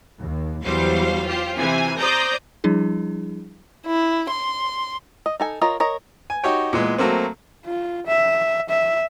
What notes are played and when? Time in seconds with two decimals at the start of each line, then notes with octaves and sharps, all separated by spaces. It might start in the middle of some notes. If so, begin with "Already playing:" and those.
0.20 D#2
0.64 E2 F#3 G3 C5 F5
1.25 F4 G4 C5
1.55 C3 E3 G#5
1.99 C5 D5 A#5 D#6 G6
2.64 F3 G3 D4 E4 G#4
3.86 E4
4.31 C6
5.26 D#5
5.40 D#4 A4 G#5
5.61 F4 A#4 C#5 D#5
5.80 A#4 C#5 D#5
6.30 G#5
6.44 D#4 F#4 G4 C#5 G5
6.73 A#2 E3 G#3 B3
6.98 F#3 A3 A#3 C4
7.65 F4
8.07 E5
8.69 E5